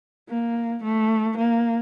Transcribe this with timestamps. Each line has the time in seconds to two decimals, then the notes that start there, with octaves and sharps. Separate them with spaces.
0.29 A#3
0.83 A3
1.37 A#3